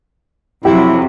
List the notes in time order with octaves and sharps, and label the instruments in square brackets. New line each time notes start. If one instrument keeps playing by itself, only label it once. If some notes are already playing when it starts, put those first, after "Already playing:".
[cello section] F2 C3 F#3 [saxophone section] E4 [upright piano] G4